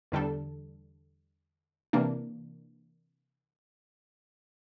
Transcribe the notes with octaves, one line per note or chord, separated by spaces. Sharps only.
E2 D3 G3 D4 A4
C3 E3 A#3 D4